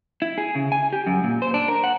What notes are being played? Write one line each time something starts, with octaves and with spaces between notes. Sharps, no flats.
E4
G#4
C#3
G#5
G4
F#2
A#2
C5
D4
A#4
F#5